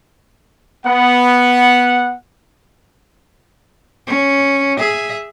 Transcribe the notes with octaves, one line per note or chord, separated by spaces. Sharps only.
B3 F#5
C#4
G#4 E5